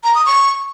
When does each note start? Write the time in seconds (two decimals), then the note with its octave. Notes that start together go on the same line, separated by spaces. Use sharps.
0.04 A#5
0.15 D#6
0.26 C#6